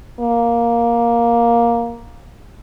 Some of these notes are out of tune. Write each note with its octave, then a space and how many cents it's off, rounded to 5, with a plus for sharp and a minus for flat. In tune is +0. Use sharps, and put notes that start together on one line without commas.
A#3 +10